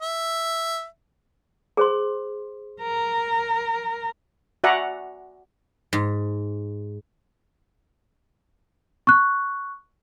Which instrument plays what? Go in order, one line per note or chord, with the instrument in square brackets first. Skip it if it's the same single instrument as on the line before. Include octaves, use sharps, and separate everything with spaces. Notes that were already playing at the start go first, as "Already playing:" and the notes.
[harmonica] E5
[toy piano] G#4 C5 C6
[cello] A#4
[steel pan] F#4 D5 E5 F#5 G#5 A#5
[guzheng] G#2
[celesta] C#6 F#6